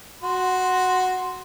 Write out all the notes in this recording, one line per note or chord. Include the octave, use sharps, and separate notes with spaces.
F#4 C6